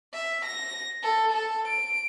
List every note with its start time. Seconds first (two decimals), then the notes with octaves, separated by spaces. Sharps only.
0.14 E5
0.45 A#6
1.03 A4
1.32 A4
1.68 D7